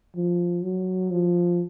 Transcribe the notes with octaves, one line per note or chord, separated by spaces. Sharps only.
F3
F#3
F3